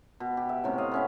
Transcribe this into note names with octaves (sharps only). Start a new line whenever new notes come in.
B2
G4
E5
A2 C3 C#4
D#5 F5
B3 C#4 E5